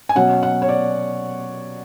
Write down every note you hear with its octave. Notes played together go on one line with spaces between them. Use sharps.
G#5
B2 F#3 C#4 F#5
F#5
C#5
D5